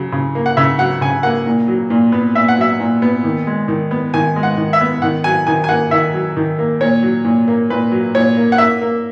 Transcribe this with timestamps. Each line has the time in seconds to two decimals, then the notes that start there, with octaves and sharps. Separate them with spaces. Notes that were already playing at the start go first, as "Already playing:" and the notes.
Already playing: C#3 F#3
0.12 C#3
0.35 A#3
0.46 F#5
0.57 C#3 E5
0.79 F#3 F#5
1.01 C#3 G#5
1.23 A#3 F#5
1.46 A#2
1.68 F#3
1.90 A#2
2.12 B3
2.35 A#2 E5
2.48 F#5
2.58 F#3 E5
2.80 A#2
3.02 B3
3.24 D#3
3.47 G#3
3.68 D#3
3.91 B3
4.14 D#3 G#5
4.36 G#3
4.43 F#5
4.57 D#3
4.73 E5
4.81 B3
5.02 D#3 F#5
5.24 F#3 G#5
5.47 D#3 G#5
5.64 G#5
5.69 A#3 F#5
5.91 D#3 E5
6.14 F#3
6.37 D#3
6.59 A#3
6.81 A#2 C#5
7.03 F#3
7.25 A#2
7.48 A#3
7.70 A#2 B4
7.91 F#3
8.14 A#2 C#5
8.37 A#3
8.52 F#5
8.58 A#3 E5
8.82 A#3